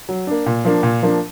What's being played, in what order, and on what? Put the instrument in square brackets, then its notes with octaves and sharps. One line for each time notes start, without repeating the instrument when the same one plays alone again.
[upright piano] F#3
A#3 D4
A#2
F3 A#3 D4
A#2
F3 A#3 D4